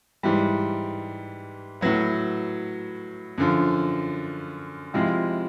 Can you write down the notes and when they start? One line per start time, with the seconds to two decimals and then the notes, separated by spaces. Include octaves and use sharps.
0.23 G#2 E3 G3
1.81 A2 F#3 B3
3.38 F#2 D3 F3
4.94 C3 F3 G#3 C4 E4